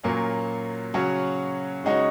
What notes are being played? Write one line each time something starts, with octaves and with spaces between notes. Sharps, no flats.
A#2 F#3 A#3 C#4
C#3 F#3 C#4 F#4
C#3 G#3 D#4 F#4 C#5